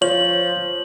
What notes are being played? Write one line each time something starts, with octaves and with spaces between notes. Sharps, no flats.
F3 C#5 F#7